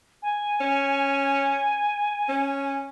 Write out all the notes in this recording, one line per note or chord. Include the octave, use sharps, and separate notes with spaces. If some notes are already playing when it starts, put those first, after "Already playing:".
G#5
C#4
C#4